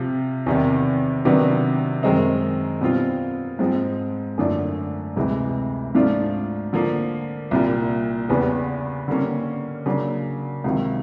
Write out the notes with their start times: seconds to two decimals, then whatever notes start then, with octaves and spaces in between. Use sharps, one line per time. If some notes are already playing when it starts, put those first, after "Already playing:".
Already playing: C3 F3 F4
0.46 E2 C3 D#3
1.25 C3 D#3 F#3 B3 D4
2.03 F#2 D#3 G#3 C4 D#4
2.81 B2 G3 C4 F4
3.59 G#2 F3 G#3 C4
4.38 F#2 D3 F3 A3 D4
5.16 D2 C3 E3 G#3
5.95 G#2 F3 A3 D4 F4
6.73 D3 F3 A#3
7.51 C2 A#2 G3
8.29 E2 C#3 E3 G3 B3
9.08 D3 G3 A#3 C#4
9.86 C#3 F#3 A#3 D4
10.64 C#2 C3 D#3 F#3